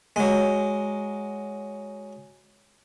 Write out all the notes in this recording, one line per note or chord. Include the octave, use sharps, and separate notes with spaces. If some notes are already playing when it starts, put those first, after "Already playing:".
F#3 G#3